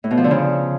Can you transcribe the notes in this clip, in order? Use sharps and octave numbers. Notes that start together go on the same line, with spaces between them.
A2
B2
F3
D3
C#3